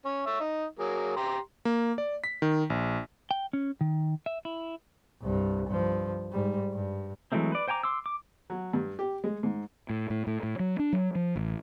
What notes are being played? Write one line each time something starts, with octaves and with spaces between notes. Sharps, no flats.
C#4
C#5 E5
D#4
F#3 A#3 G#4
G4 A#5 C6
A#3
D5
B6
D#3
A#1
G5
C#4
D#3
E5
E4
C2 G2
G2 F3
G#2 G3
G2
E3 F#3 G#3 A3 C4
B4 D5
C5 G5 G#5 A#5 D6
C6 D6 E6
D6
F#3
G2
G4
G#3
G#2
A2
A2
A2
A2
F#3
D4
F#3
F3
A1